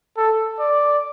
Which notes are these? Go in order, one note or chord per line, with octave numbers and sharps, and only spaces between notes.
A4
D5